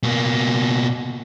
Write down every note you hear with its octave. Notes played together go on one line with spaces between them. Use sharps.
B2 A#3